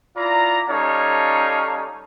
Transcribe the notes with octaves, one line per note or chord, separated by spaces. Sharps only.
E4 F4 D5 A#5
G3 C#4 D#4 A4 C#5 F5